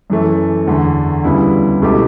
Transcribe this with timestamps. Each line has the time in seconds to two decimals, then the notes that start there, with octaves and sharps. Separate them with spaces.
0.10 F#2 E3 A3
0.67 E2 D3 A3
1.24 D2 C#3 G3 B3 E4
1.81 C#2 B2 A3 E4 G4